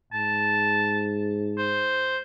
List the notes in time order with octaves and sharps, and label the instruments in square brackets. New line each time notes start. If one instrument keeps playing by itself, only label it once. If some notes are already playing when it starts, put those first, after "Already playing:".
[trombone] G#2 [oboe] A5
[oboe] C5